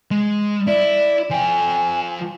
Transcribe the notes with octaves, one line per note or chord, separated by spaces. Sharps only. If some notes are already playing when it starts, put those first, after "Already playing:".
G#3
E4 D5
F3 G5 G#5